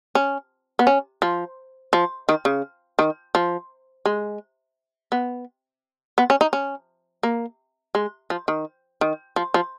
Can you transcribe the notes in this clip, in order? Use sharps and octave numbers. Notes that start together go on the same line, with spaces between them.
C#4
B3
C#4
F3
F3
D#3
C#3
D#3
F3
G#3
B3
B3
C#4
D#4
C#4
A#3
G#3
F3
D#3
D#3
F3
F3